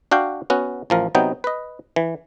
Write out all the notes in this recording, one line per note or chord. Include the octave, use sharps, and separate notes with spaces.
D4 F#4 F5 G5
B3 C#4 F#4
A1 F3 A#4
C3 F#3 B3 D#4 G5
B4 D#5
E3